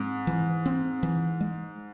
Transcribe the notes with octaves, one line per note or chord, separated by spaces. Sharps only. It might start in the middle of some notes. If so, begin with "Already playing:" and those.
Already playing: G#2 C4
E3
C4
E3
G#3